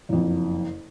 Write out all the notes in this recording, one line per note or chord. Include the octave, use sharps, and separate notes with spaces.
F#1 F2